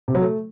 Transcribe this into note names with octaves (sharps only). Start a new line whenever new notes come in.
C3
F#3
A3